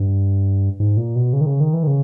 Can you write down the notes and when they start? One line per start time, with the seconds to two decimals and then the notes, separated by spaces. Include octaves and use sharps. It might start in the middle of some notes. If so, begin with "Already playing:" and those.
Already playing: G2
0.80 G#2
0.97 A#2
1.16 B2
1.33 C#3
1.41 D#3
1.46 C#3
1.60 D#3
1.73 E3
1.83 D#3
1.87 C#3